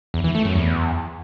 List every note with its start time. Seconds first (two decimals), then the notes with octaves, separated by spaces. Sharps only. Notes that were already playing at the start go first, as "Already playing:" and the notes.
0.14 E2
0.24 E3
0.35 A3
0.45 F#2
0.55 E2